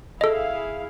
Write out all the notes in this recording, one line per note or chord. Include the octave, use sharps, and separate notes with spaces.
E4 G#4 A4 D#5 F5